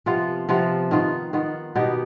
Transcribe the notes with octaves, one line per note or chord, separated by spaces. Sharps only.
C3 F3 B3 F4
C3 F3 B3 F4
D#3 B3 F4
D#3 B3 F4
B2 B3 D#4 G4